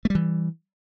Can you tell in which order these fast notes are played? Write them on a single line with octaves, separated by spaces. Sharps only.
A3 G3 E3